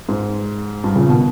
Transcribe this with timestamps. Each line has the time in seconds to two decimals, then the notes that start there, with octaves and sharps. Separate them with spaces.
0.09 G#2
0.84 G2
0.96 A#2 C#3
1.08 B2 D#3